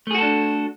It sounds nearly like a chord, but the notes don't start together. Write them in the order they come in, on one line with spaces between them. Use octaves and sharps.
A3 G#4 F#4 A4 D4